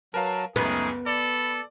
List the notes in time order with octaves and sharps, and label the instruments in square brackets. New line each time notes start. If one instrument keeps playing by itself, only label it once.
[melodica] F#3 A5 [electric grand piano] A#4 B4 F5
[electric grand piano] C#2 F#2 C#3 [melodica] A3 D#4 D#6 [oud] B3 [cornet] G#4
[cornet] A4 [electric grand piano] D5 [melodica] B5